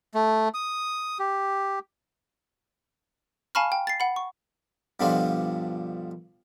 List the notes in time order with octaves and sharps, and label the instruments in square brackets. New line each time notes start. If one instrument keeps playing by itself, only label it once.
[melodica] A3
D#6
G4
[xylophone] F5 G#5 A5 B5 C#6 F6
G5
A6 C7
F#5 B5
C#6
[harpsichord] G2 B2 D3 F3 G3 F4